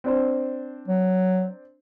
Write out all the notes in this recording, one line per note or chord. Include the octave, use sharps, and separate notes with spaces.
C4 D4 C5
F#3